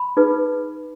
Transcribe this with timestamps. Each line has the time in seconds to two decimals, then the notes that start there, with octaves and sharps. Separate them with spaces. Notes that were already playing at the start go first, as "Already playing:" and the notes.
Already playing: B5
0.17 D#4 G#4 B4